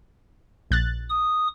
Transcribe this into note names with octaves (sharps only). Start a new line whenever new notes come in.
A#1 F#6 A6
D#6